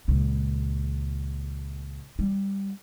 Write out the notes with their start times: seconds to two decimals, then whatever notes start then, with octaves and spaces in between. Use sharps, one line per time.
0.08 C#2 A#2
2.19 G3